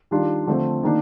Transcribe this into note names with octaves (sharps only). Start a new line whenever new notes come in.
D#3 G3 D4 F4
D3 F3 A3 C4
D#3 A#3 D4